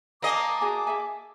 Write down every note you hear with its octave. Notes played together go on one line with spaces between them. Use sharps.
A#3 A#4 D#5 G#5 A5 D6
F#4 G#4 G#5
G#4 E5 G#5